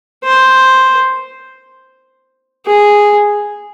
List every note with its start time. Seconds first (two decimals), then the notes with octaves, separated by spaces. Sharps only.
0.24 C5
2.66 G#4